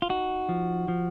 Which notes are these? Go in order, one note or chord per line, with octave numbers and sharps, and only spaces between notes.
F4
D#4 F#4
F3
F3